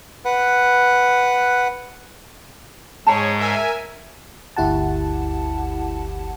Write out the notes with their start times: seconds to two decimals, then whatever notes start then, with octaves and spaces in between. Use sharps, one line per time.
0.25 B4 F#5
3.06 G#2 G#3 G#4 C#5 A5 A#5
3.38 A#4 E5 G#5
4.57 G1 D2 E4 G4 F#5 A5